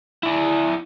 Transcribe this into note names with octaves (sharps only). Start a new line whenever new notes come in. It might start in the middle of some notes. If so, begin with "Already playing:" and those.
E4 D5